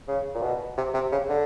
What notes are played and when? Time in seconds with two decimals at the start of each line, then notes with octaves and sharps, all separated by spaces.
0.08 C#3
0.35 A#2
0.43 B2
0.78 C3
0.94 C3
1.12 C#3
1.29 D3